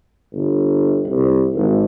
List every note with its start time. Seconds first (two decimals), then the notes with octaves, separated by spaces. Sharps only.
0.33 G1
1.07 C2
1.55 G#1